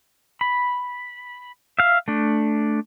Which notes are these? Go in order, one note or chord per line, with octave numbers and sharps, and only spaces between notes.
B5
E5 F5
A3 D4